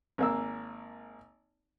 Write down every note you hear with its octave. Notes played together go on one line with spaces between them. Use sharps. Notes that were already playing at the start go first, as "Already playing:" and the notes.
G#1 A#3 E6